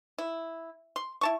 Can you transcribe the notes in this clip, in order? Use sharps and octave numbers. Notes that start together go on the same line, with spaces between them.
E4
C6
E4 A5 C#6